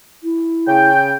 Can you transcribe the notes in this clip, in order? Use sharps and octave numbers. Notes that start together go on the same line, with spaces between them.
E4
C#3 G5